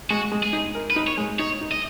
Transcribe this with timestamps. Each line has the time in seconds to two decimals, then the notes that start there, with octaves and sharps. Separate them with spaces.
0.10 G#3 F#4
0.32 G#3
0.43 G#4
0.53 D#4
0.75 A#4
0.91 B4
0.96 D#4
1.07 C#5
1.18 G#3
1.39 D#4 C#5
1.61 D#4
1.71 D#5